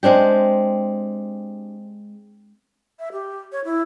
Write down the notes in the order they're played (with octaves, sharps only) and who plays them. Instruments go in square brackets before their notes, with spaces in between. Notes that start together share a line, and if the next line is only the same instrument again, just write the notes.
[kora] G#3 C4 D4 G4
[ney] E5
G4
C#5
E4